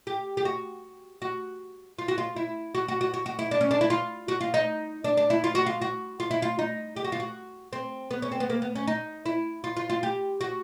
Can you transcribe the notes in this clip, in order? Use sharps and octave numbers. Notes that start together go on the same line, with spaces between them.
G4
G4
F#4
F#4
F4
F#4
F4
E4
F#4
F#4
F#4
F#4
F#4
E4
D4
C#4
D4
E4
F4
F#4
F4
D#4
D4
D4
E4
F4
F#4
F4
F#4
F4
E4
F4
D#4
G4
F#4
F4
F#4
C4
B3
C#4
C4
B3
A#3
B3
C#4
D#4
E4
F4
F4
F4
G4
F#4